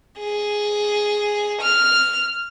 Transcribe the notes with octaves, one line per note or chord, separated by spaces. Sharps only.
G#4
F6